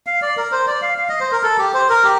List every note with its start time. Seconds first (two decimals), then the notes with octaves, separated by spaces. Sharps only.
0.07 F5
0.22 D5
0.37 A#4
0.52 C5
0.67 D5
0.82 F5
0.98 F5
1.09 D#5
1.20 C5
1.32 A#4
1.43 A4
1.58 G4
1.74 C5
1.89 A#4
2.04 G4